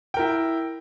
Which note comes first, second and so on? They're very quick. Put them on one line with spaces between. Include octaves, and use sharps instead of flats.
G5 A#4 E4